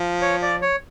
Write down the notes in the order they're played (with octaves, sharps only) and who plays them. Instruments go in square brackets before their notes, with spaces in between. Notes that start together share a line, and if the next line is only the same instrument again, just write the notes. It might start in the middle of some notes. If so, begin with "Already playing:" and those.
Already playing: [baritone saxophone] F3
[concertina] C#5
D5
C#5